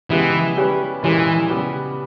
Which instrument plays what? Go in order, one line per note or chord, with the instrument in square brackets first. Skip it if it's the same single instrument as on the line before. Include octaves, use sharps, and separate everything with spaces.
[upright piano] C#3 G#3 B3 E4 G4 [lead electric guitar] E3
[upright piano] G3 C#4 G4 B4
[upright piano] A#2 G#3 C#4 G4 A#4 [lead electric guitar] E3
[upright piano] C#3 G3 B3 G4 B4